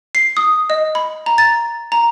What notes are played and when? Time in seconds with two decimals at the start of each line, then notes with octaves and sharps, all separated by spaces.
0.15 C7
0.37 D#6
0.70 D#5
0.95 B5
1.26 A#5
1.38 A6
1.92 A#5